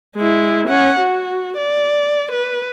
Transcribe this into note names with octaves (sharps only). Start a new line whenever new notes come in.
G#3 E4
C#4 F#5
F#4
D5
B4